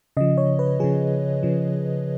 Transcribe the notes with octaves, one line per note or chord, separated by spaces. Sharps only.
C#3 F3 D#5
C#5
B4
C#3 F3 G#4
C#3 F3